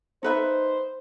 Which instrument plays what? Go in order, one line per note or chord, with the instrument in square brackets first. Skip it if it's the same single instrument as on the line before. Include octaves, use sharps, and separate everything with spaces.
[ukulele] D#4 B4 E5 [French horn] C5